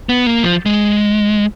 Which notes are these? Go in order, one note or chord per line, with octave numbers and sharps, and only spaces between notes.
B3
A#3
F3
G#3